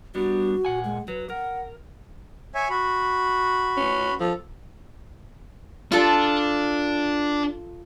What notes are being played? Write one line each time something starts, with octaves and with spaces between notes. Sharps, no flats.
G3 B3 D4 F#4
A#2 F#5 G#5
G#3
F#3 B4
A#4 F#5
C#5 E5 G#5
F#4 B5
C#4
F3 A4
D4 F4 A4